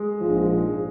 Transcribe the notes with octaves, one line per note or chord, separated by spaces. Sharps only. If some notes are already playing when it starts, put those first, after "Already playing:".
Already playing: G#3
A#1 G#2 F3